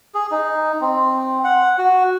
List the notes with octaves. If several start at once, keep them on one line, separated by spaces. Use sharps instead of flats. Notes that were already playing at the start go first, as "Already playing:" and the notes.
G#4
D#4
C4
F#5
F#4